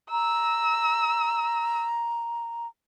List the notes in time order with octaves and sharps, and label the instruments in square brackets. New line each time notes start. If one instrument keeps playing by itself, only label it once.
[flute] A#5 [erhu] E6